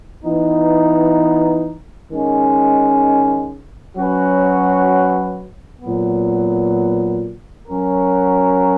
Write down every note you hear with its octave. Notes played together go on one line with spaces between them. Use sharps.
E3 B3 D#4
D#3 G#3 C#4
F#3 C#4 F#4 B4
A#2 F#3 B3
F#3 C#4 F#4 A#4